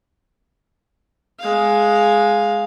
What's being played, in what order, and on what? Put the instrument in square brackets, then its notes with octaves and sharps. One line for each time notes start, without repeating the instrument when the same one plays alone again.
[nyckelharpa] G#3 F5